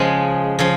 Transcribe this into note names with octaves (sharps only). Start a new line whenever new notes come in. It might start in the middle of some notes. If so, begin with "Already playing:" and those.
Already playing: C#3 F3 G#3
C#3 F3